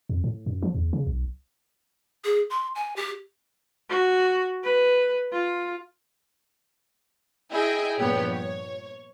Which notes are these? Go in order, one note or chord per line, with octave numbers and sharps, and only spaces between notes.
F2
A2
F#2
F3
E2
C#3
B1
G#4
C6
G#5
G4
F#4
B4
F4
E4 G#4 D#5 G5
G2 A#2 F3 B3 G4 C#5
C#5